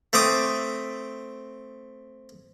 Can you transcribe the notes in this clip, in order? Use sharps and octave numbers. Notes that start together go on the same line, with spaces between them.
A3 C4 D6 D#6